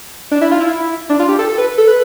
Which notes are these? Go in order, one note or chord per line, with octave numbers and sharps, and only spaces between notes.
D4
E4
F4
E4
D4
F4
G4
A4
A4
B4
A4
B4